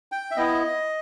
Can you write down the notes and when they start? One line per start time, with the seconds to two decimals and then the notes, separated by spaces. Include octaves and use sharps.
0.12 G5
0.31 E5
0.36 B3 E4 D#5